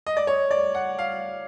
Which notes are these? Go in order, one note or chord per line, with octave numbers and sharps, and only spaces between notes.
D#5
D5
C#5
D5
F#5
F5